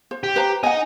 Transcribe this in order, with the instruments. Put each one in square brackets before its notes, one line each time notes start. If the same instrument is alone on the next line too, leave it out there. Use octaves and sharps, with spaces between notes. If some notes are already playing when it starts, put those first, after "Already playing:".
[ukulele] C5
[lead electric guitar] G4
[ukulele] B4 C5 A#5
[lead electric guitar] D#4 D#5 [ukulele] F#5 G#5